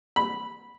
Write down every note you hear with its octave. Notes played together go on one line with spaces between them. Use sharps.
B5